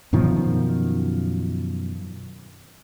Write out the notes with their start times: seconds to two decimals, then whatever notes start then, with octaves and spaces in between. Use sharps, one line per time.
0.13 F#2 B2 D#3 F3